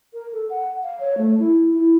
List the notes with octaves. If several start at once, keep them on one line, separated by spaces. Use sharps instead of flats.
A#4
A4
F#5
F5
C#5
A3
E4
E4